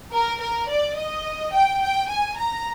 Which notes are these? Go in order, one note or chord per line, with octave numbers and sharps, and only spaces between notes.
A#4
A#4
D5
D#5
G5
G5
G#5
A#5